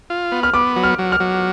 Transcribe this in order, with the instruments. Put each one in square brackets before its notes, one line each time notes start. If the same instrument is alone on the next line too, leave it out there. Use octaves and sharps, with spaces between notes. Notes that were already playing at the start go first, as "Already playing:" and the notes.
[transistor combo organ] F4
B3
[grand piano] F6
[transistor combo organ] B3 [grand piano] D6
[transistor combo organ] F#3
[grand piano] F6
[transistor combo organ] F#3
[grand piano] F6
[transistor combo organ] F#3